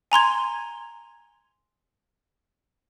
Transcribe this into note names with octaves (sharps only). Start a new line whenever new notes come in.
G#5 A#5 C6 G#6